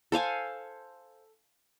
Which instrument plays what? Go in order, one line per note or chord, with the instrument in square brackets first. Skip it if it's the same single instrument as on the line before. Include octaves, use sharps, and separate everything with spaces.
[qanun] A4 C5 F5 G#5